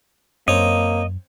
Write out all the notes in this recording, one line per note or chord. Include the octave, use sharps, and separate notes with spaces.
F#2 A#3 C4 C#5 D#5